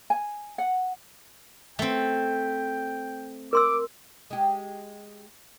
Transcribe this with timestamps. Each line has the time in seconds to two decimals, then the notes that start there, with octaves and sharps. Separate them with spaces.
0.10 G#5
0.58 F#5
1.79 A3 C4 G5
3.53 A#4 C6 D6 E6
4.30 G#3 G4